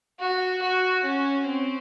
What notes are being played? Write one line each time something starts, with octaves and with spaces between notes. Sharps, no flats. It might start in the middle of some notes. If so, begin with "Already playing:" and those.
F#4
F#4
C#4
C4